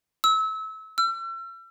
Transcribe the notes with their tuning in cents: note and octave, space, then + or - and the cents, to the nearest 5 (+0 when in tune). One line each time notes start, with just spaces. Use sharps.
E6 -30
E6 +40